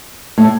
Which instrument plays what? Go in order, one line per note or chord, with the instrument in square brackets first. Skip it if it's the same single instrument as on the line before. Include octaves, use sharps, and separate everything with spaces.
[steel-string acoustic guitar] A2